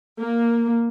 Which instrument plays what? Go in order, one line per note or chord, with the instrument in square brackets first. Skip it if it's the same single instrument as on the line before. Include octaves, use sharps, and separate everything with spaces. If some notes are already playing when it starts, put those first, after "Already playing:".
[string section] A#3